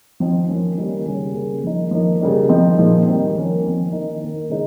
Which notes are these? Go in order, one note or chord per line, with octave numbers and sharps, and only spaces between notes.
F3 C4 D#4
F3 A#3 C#4
D#3 G3 A#3 C#4
C#3 G3 C#4
C#3 G3 A#3
F3 A#3 D#4
F3 A#3 D#4
C#3 G3 A#3 D#4
F3 C4 D#4
A#2 F3 G#3 D#4
D#3 G3 C4
F3 A#3 C#4
F3 C4 D#4
D#3 A#3 D#4
D#3 A#3 D#4
C#3 G#3 D#4